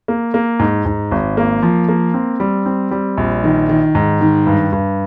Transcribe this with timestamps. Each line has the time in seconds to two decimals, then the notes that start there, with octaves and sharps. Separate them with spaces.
0.08 A#3
0.34 A#3
0.59 G#2
0.85 G#2
1.11 G#1
1.37 A#3
1.63 F3
1.89 A#3
2.14 C4
2.40 G3
2.66 C4
2.91 G3
3.17 A#1
3.44 D#3
3.69 D#3
3.95 G#2
4.21 D#3
4.47 G2
4.73 G2